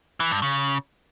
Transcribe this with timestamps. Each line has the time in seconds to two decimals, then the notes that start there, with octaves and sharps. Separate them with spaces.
0.20 E3
0.31 G2
0.42 C#3